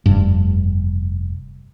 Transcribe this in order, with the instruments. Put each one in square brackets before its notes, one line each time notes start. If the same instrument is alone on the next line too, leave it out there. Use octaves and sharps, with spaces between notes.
[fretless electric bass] F1 G2